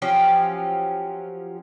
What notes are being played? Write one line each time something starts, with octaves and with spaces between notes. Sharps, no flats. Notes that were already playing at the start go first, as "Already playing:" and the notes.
F3 F#3 C#4 G4